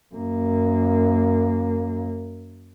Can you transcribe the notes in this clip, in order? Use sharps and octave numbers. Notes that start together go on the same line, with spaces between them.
F#2 A#3